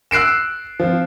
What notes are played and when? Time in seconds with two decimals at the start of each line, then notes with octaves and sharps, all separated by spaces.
0.11 E6 F#6 C7 D7 E7
0.80 F3 C4